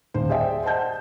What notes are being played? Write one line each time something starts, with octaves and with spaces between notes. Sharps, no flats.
D#1 C5
G#4 C5 D5 E5 G5 G#5
C5 D#5 F#5 A5 G6